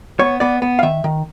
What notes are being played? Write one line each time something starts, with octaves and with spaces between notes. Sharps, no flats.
B3 C#5
B3 D5
B3
F5
D#3 E5
D#3